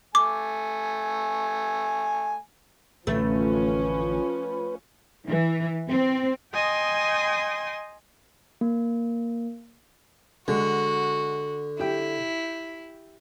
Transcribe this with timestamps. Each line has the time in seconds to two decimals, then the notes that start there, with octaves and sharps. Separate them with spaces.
0.15 A3 G#5 D6
3.07 A1 A2 D3 F3 A3 C#4 B4
5.26 E3
5.88 C4
6.53 D#5 G5 G#5 C6 D#6
8.61 A#3
10.48 D3 G#3 F#4
11.80 E4 G4 G5